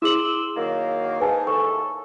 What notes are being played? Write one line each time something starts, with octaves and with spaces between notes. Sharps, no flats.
E4 G#4 C6 D6 E6 F#7
D#3 F#3 A#3
G#2 B4 G#5 A5
D#2 A2 A4 G#5 A5 C#6